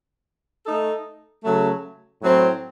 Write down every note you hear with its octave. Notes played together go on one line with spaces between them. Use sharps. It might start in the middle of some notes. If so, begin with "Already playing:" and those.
A3 D#4 A4
C#3 F#3 A3
A2 F#3 C4